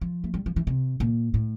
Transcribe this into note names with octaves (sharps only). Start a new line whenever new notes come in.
F3
A3
G3
F3
E3
C3
A#2
A2